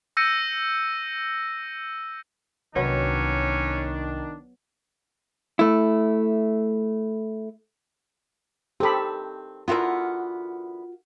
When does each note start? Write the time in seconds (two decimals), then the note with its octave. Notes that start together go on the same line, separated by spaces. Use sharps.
0.17 E6 G6 A#6 C#7 D#7
2.76 C2 D#3 F#3 B3 C#4 D4
5.59 A3 E4
8.80 D#3 C4 G4 A4 B5
9.68 D3 E3 B3 F4 F#4 A#4